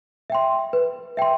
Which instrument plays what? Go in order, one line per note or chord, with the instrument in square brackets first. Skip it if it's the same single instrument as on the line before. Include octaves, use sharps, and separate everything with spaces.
[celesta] E5 G5 C6
B4
E5 G5 C6